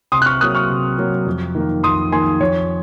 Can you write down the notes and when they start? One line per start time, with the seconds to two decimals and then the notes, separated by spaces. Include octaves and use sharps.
0.12 C3 C6 D#6
0.22 F#6
0.26 C#6 F6
0.41 F#3 A#3 D#6 F#6
0.55 C#6 F6
0.70 C3
0.99 F#3 A#3
1.26 F2
1.55 D#3 A#3
1.83 F2 C6 D#6
2.11 D#3 A#3 G#5 C6
2.40 F2 C#5